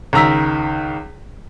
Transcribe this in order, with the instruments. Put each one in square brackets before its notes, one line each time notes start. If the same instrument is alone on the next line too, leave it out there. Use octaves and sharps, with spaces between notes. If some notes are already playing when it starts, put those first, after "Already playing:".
[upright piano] C#2 D#3 A#5 E6 B6